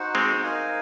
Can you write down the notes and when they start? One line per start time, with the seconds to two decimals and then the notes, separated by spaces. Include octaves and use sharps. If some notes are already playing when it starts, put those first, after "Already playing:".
Already playing: D#4 F#4 C5 F#5
0.15 G#3 C4
0.43 D#4 A#4 F5 G#5